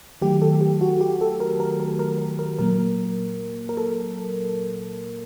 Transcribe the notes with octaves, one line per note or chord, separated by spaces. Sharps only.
D#3 F#3 A3 G4
A4
G4
F#4
G4
A4
A#4
A#4
A#4
A#4
A#4
A#4
A#2 F#3 A#3 A#4
A#4
A4